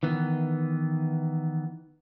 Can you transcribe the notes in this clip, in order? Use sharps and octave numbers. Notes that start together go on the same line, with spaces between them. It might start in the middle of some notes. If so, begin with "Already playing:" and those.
D#3 E3 B3